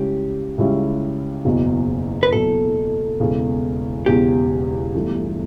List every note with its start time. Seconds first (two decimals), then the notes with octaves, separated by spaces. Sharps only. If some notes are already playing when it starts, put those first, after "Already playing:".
Already playing: C#2 C#3 G3 C#4 E4 G4
0.58 C#2 C#3 G3 C#4 E4
1.45 F#1 E2 B2 F#3
2.23 B4
2.32 F#1 E2 B2 F#3 A4
3.20 E1 E2 C#3
4.06 E1 E2 C#3 G4
4.95 G1 G2 E3 A3